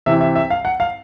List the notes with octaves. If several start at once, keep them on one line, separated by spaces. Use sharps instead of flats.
C3 E3 E5
E5
E5
F5
F#5
F5